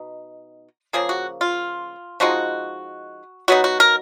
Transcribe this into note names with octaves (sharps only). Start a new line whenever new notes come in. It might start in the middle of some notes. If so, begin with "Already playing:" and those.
Already playing: B2 D#4
C#3 F3 A#3 G#4
F#4
F4
F3 G#3 D#4 F#4
F#3 B3 D#4 F#4
F#4
A#4